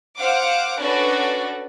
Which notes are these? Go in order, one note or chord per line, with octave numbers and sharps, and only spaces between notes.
C5 F5 F#5 D6
C#4 D4 F#4 A4 B4 D5